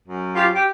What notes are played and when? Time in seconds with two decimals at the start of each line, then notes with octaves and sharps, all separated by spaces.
0.06 F#2
0.35 F4 G4
0.55 G4